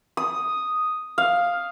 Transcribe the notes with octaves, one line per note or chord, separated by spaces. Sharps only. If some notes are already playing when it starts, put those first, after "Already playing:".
D#6
F5